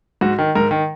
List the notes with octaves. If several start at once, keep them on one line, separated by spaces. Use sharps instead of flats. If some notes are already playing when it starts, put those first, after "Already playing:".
G#2 F#4
D#3
G#2 A#4
D#3